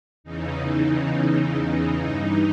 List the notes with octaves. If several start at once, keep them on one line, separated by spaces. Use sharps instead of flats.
E2 C#3 E3 D#4
D#4
G2 E3 D#4